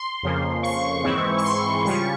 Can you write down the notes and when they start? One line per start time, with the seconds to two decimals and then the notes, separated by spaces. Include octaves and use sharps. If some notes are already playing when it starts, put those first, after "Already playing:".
Already playing: C6
0.23 F2 C#3 F3 A#3
0.63 C#6
1.04 G#2 E3 G#3 C4 E4
1.38 C#6
1.44 C6
1.85 C#3 G3 C#4 F4 C#6